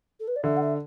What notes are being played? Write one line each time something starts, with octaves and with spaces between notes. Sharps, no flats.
A4
B4
D5
D3 E5
F#5
E5